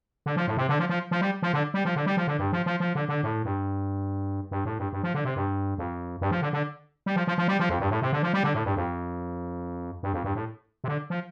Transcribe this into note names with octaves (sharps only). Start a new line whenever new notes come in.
D3
F3
A2
C3
D3
F3
F3
F3
G3
F3
D3
G3
F3
D3
G3
F3
D3
G2
F3
F3
F3
D3
D3
A2
G2
G2
A2
G2
G2
F3
D3
C3
G2
F2
G2
F3
D3
D3
G3
F3
F3
F3
G3
F3
F2
G2
A2
C3
D3
F3
G3
D3
A2
G2
F2
G2
F2
G2
A2
C3
D3
F3